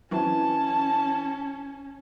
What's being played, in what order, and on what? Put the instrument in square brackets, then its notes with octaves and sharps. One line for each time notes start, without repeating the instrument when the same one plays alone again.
[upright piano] E3 [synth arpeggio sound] F#3 C4 E4 [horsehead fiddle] C#4 [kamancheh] A5